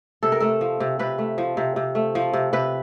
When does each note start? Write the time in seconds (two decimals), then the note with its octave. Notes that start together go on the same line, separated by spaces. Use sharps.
0.23 C3 A4
0.32 A#4
0.40 A3 A4
0.61 F3
0.80 C3
0.99 C3 B4
1.18 A3
1.38 F3
1.57 C3
1.76 C3
1.95 A3
2.15 F3
2.33 C3
2.53 C3 B4